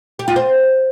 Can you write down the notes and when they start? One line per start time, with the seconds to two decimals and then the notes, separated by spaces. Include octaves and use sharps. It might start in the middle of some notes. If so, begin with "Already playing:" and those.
0.19 G4
0.28 F4
0.36 C5